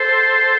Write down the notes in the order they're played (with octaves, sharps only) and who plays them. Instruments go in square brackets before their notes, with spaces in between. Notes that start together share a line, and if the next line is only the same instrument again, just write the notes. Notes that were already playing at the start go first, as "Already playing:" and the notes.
Already playing: [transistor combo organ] A4 C5